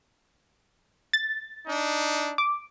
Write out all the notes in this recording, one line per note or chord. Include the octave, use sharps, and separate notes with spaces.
A6
D4 D#4
D6